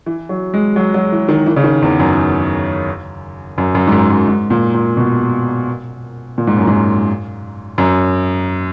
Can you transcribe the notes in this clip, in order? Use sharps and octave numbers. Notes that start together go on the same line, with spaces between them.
E3
F#3
G#3
F#3
F#3
E3
D#3
E3
C#3
D#3
E2
F#2
F#2
F#2
G#2
F#2
F#2
G#2
A#2
A#2
B2
A#2
G#2
F#2
G#2
F#2